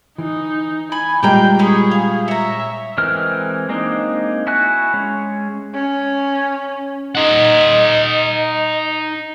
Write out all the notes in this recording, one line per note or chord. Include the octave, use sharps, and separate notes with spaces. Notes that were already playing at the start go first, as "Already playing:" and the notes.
E3 D#4
G#5 B5
A#2 G3 G#3 G5 A#5 D6 G6
C#4 G#4 C#5 B5
F5
C#5 E5 A#5
E3 G#3 C4 A#4 F6
G#3 A#3 C4 D4 D#4
E4 F#4 G#5 F#6
G#3 C#4
C#4
D#4 D#5 F#5